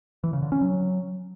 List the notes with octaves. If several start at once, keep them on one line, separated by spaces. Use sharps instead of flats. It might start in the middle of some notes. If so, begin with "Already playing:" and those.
E3
C#3
D3
C#4
F#3